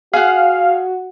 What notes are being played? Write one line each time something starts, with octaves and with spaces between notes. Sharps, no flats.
F#4 G#4 F5 F#5